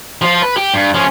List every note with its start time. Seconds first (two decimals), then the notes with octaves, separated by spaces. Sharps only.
0.22 F3 F4
0.42 B4
0.57 G4
0.74 G2
0.94 F3 C#4